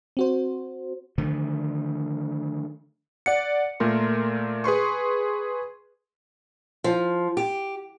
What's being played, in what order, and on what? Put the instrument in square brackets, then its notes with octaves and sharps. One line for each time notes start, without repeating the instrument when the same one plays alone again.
[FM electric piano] C4 F#4 C5
[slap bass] D3 D#3 F3 A3
[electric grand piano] D5 F#5 C#7
A#2 A3 A#4 C6
G#4 B4 C6 C#6
[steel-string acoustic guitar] F3
G4